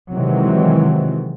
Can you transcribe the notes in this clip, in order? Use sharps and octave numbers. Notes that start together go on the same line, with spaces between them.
C3 D#3 E3 F#3 G#3 C4